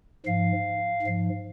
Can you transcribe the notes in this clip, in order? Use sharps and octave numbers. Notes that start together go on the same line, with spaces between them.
G#2 F3 F5
G#2 F3